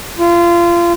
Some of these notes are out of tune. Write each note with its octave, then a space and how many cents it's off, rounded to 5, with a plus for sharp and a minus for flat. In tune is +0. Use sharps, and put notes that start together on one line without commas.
F4 -25